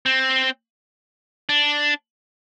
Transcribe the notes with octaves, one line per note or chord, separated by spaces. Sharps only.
C4
D4